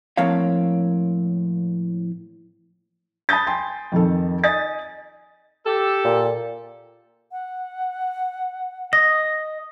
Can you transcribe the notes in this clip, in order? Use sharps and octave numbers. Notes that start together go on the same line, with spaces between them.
A2 F3 A#3 C4 C#5 F5
A5 B5 D#6 G6 A6
G5 G#5 C6
F2 D#3 A4
D#5 G#5 D#6 A6
G4 A4
A#2
F#5
D#5 A#6